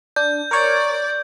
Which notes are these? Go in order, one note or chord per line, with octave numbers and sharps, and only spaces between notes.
D4 G6
A#4 C#5 D5